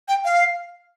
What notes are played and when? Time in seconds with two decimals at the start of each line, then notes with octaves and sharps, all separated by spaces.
0.08 G5
0.25 F5